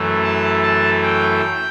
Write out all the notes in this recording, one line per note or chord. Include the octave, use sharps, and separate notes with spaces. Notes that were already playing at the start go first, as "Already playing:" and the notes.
Already playing: F#2 E3 A3
A5
A5
G5